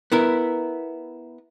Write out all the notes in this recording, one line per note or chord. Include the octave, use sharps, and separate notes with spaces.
B3 E4 A#4